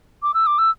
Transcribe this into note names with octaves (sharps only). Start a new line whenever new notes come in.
D6
E6
D6
E6